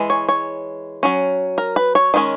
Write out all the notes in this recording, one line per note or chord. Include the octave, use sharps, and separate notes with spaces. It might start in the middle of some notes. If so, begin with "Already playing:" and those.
Already playing: E3 G#3
C#5
C#5
F#3 C#4
A#4
B4
C#5
D#3 G#3 C#4